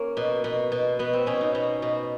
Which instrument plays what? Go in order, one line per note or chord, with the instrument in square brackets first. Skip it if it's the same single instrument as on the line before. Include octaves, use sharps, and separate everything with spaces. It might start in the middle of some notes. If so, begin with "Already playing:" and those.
Already playing: [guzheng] A#3 C#4
B2
B2
B2
B2 B3
C4
B2 C#4
D#4
B2
B2